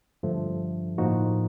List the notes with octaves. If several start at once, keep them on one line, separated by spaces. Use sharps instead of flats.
G2 D3 F3 A3
A2 F3 A#3 D#4 F#4